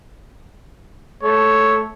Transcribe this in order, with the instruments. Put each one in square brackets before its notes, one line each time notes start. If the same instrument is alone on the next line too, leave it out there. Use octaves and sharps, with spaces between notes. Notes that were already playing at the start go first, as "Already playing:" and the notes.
[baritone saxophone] A3 [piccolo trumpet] C#5